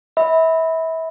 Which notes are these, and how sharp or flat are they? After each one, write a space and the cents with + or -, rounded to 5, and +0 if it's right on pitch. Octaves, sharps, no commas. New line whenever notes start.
E5 -30 B5 +0